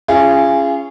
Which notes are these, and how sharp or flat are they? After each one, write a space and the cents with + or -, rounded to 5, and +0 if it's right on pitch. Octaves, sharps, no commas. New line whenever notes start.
C#4 +0 F4 -35 G#4 -10